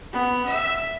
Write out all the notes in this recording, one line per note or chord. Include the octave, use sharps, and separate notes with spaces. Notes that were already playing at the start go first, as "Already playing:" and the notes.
B3
E5